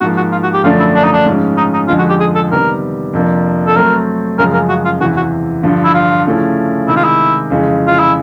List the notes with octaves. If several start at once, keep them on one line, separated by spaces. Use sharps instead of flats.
G#2 F3 A#3 F#4
F#4
F4
F#4
G4
F#2 D3 F3 A3 D4 F4
E4
D4
D#4
D4
G#2 F3 G#3 C#4
D#4
D#4
F2 D3 F3 G#3 F4
F#4
G4
G#4
A4
C3 D#3 G3 B3 A#4
F2 C3 F3 A#3 D4
A4
F#3 A3 C4 A#4
F#2 C#3 F3 G#3 A#4
A#4
F#4
F4
E2 C3 E3 F#4
F#4
G2 D3 F3
E4
F4
C#3 F3 A3 C#4 E4
C3 D#3 G#3 E4
F4
E4
F2 C#3 E3 G#3
F4
E4